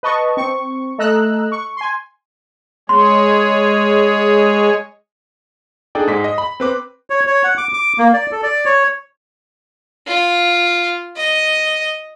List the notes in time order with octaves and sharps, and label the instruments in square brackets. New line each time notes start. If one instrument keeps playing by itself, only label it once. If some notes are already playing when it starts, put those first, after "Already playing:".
[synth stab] B4 D#5 A5 C#6
C4 C#6
A3 A4 D#5 A#5 E6 F#6
C#6
G#5 C6
[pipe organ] G#3 G#4 C#5 [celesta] C6
[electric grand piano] D4 D#4 G#4 A4 D5 G5
G#2 G#3 B6
D#5
B5
C4 B4 D6
[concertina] C#5
C#5
F#5
D6
D6
A#3
D5
A4
D5
C#5
[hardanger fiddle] F4
D#5